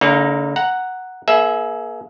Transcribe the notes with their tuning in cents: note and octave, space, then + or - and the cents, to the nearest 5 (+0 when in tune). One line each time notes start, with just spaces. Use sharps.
D3 -45 A#3 -15 D#4 +0
F#5 +0 A#5 +0
A#3 +35 G#4 +35 E5 -10